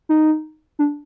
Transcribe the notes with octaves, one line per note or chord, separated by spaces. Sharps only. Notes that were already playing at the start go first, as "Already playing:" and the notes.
D#4
D4